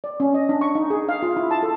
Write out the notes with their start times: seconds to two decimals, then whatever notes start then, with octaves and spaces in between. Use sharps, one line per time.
0.04 D5
0.20 C#4
0.34 D#5
0.49 D4
0.61 C#6
0.75 D#4
0.90 G#4
1.09 F5
1.22 F4
1.37 E4
1.51 A5
1.63 A4